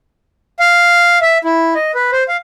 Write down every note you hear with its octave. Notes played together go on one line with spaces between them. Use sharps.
F5
E5
E4
D#5
B4
C5
F5